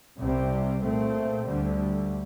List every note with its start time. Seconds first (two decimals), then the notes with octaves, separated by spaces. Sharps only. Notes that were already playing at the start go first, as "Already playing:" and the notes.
0.18 C2 C3 G3 C4
0.81 A#2 A3 C4
1.44 D2 D3 G3